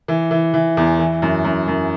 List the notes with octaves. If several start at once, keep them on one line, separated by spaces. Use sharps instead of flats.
E3
E3
E3
E2
E3
F#2
F#2
F#2